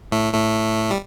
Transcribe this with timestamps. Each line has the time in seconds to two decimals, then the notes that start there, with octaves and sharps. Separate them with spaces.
0.12 A2 A3
0.33 A2 A3
0.91 G3